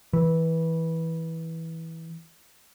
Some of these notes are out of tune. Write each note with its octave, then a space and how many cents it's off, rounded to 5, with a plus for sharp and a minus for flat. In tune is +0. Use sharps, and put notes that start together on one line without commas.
E3 -15